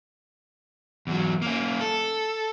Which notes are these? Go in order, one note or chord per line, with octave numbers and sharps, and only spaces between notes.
E2 F#3
A#3 C#4
A4